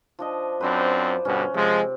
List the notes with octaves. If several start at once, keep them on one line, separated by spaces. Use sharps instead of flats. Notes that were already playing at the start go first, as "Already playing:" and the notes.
F3 D4 D#5
F#2 C4 D4 B4 C5 D5
G2 B2 D3 C#4
C3 F3 G#3